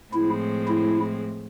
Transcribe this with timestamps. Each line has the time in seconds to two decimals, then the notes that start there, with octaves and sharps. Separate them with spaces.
0.14 A2 F3 G#3 C4 E4
0.68 E4